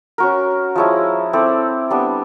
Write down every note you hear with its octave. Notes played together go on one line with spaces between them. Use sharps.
C#4 F#4 A#4
F3 G#3 C#4 E4
C4 E4 A4 D5
G3 B3 D4